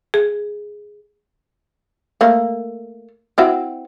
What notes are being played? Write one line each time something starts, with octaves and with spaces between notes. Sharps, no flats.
G#4
A3 A#3
C4 E4 F#4